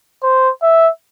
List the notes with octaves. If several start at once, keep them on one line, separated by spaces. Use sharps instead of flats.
C5
E5